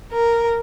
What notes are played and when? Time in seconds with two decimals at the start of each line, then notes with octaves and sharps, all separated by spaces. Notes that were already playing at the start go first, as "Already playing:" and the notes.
0.11 A#4